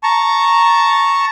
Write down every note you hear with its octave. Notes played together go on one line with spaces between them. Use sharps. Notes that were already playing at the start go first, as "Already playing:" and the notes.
A5 A#5 C#6